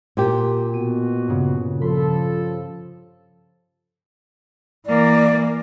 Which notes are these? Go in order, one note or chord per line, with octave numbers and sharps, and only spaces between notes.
A#2 G4
B2 F#4 D#7
G2 C#3
F3 A4 B5 C6
E3 A#3 D5